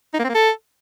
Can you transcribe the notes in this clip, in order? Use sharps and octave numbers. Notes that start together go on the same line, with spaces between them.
D#4
A#3
C4
A#3
A4